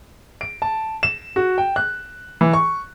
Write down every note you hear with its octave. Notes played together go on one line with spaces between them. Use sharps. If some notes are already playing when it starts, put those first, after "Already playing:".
D7
A5
E7
F#4
G5
F#6
E3
C#6